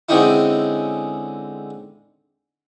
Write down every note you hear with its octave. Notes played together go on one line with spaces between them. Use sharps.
D3 G#3 C4 C#4 D#4 E4